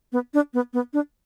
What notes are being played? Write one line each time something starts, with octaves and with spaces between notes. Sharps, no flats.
B3
D4
B3
B3
D4